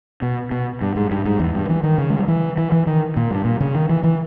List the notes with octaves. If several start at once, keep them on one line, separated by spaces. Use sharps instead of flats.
B2
B2
G2
G#2
G2
G#2
E2
G2
E3
D#3
C#3
G#3
G3
E3
E3
E3
D#3
A#2
G2
A#2
C#3
D#3
E3
E3